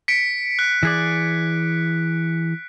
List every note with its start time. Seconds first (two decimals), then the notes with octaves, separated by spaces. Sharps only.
0.08 B6 C#7 D7
0.59 F#6
0.83 E3 G#4 D5